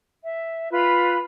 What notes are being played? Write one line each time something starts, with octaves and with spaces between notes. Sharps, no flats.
E5
F4 B4 B5